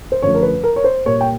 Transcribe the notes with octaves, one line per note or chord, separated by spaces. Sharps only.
C5
F#2 D3 F3 A3 C#5
A#4
B4
A#4
C#5
C5
A#2 G3 A#3 C#5
G5